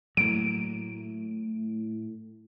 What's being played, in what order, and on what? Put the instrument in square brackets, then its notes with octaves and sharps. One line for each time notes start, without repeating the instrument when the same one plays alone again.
[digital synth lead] A2 [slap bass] F#3 A#3 [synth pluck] D7